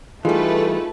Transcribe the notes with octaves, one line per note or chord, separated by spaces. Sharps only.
E3 G3 A3 D#4 F4 G#4 B4